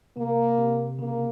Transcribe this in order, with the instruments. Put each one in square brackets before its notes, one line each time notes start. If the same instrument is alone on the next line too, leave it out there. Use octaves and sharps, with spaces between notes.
[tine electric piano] C3 [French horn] A#3
[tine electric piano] C3
[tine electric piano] C#3 [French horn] A#3